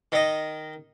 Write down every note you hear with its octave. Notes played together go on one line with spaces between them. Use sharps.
D#3 D#5